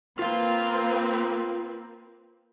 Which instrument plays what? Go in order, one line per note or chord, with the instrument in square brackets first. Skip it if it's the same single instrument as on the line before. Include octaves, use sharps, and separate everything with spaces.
[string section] A#3 C4 B4 [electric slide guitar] F4 F5